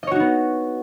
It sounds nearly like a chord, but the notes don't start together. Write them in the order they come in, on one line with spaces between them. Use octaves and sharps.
D#5 C#5 F#4 D#4 B3